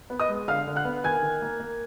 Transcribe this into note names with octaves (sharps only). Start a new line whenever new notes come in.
B3
D#5 D#6
G#3
D3 F5 F6
D3
F#5 F#6
B3
D#3 G#5 G#6
D#3
A#3
A#3